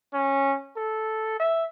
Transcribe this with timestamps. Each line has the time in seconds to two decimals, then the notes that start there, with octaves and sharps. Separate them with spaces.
0.13 C#4
0.76 A4
1.40 E5